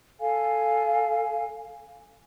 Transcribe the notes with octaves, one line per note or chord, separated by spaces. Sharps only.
A4 F5 G#5